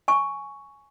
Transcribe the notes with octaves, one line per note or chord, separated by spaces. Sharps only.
G#5 C#6